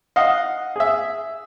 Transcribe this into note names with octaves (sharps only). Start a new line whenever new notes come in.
D#5 F5 F#5
G#4 E5